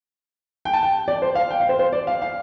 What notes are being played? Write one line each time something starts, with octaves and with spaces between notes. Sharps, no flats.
G5
A5
G5
D5
C5
F5
G5
F5
C5
C5
D5
F5
F5